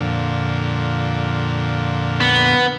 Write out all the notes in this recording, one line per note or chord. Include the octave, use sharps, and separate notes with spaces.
F2 A#2 D3
B3